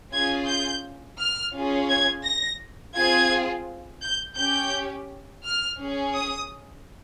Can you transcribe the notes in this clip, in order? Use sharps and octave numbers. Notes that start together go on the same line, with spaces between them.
C#4 F4 G#4 G#6
G6
F6
C#4 F4 G#4
G#6
A#6
C4 F4 G#4 G#6
G6
C#4 G4 G6
F6
C#4 G#4
D#6